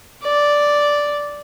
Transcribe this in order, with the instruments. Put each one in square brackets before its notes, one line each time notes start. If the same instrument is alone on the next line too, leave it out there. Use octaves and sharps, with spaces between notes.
[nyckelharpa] D5